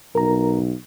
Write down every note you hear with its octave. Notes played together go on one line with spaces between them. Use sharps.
B1 A#4 A#5